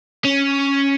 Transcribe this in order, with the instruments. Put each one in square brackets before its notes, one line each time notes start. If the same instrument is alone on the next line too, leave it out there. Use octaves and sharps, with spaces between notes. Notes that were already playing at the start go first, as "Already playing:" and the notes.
[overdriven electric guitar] C#4